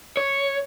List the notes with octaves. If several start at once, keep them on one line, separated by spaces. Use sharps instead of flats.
C#5